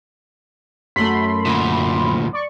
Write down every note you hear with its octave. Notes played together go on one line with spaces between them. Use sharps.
F#2 A3 B5 C6 B6
D2 A#2
D5 C#6